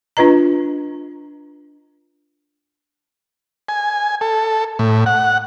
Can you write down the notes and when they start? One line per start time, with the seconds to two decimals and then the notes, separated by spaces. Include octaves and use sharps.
0.17 D4 F4 B4 D#5 A#5
3.69 G#5
4.21 A4
4.79 A2
5.06 F#5